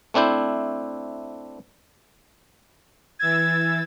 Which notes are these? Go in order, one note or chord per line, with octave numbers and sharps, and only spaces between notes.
A3 C4 D4 E4 C5
E3 E6 G#6 A6